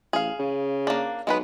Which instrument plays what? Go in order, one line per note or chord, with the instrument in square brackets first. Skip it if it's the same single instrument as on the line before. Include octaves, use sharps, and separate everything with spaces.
[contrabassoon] A1 [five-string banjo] G#4 F5
[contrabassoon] C#3
[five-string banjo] A#3 D4
[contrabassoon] B1 [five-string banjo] G#3 B3 B4